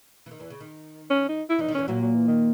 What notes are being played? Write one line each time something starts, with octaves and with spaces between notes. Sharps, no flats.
E3
D#3
E2 E3
C#3
D#3
C#4
D#4
E4
E2 E3 D#4
D#3
E2 E3 C#4
A#2 F#3 A#3
F#3
E3
D#3